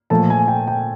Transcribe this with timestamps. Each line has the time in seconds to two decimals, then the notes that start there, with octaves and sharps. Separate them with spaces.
0.10 A#2 F3 A3 A5
0.30 G#5
0.48 G5
0.67 G5